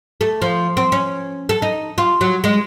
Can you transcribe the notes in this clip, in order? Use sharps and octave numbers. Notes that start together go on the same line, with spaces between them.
A3
F3
C4
C#4
A4
D#4
F4
F#3
G#3